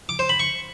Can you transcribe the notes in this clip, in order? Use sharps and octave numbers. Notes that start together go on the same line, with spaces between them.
D6
C5
B5
C#6